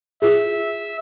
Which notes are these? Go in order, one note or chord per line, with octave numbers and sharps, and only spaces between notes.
F4 G#4 E5